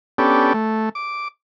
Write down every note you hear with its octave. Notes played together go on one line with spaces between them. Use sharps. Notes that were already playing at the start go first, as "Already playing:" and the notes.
B3 C#4 D4 G4 A4
A3
D6